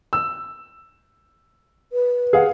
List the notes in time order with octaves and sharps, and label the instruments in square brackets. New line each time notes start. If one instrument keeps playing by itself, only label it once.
[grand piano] E6
[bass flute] B4
[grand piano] G#4 F5 F#5